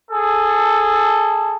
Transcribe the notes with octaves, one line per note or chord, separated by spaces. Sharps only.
G#4 A4